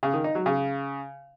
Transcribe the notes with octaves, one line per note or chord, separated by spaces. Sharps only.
C#3
D#3
D#4
F#3
C#3